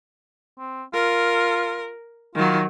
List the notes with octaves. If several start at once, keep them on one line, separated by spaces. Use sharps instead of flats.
C4
F4 A#4
D#3 F#3 F4